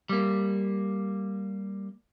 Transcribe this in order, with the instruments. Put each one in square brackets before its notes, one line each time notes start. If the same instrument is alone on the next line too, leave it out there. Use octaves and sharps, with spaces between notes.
[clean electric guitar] G3 A#3